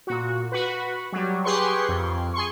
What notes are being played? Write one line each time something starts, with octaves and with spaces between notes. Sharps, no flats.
A#2 F#4
F#4 B4
F#3 G3
G4 G#4 B4 C6 C#6
F2
G#4 C6 C#6